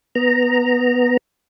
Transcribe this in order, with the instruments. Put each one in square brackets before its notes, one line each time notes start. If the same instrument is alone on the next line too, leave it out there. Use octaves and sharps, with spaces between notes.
[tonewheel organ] B3 A#5